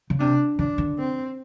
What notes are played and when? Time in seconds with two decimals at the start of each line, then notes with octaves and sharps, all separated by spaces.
0.10 C#3
0.20 C3 D4
0.59 C#3 D4
0.78 D3
0.98 C4